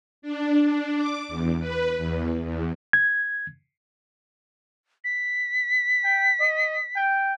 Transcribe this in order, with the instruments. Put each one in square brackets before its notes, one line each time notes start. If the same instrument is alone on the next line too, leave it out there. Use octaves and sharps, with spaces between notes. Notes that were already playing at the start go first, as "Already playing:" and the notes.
[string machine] D4
D4
D6
E2
B4
E2
E2
[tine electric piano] G#6
[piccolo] B6
[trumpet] G5
D#5
G5